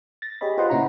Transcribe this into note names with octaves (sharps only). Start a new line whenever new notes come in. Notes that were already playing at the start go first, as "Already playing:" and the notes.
A6 A#6
G4 G#4 C#5 D#5 B5
F4 B4 C5 D#5 F#5 C6
A#2 C#3 C#4 E4 F#5 A#5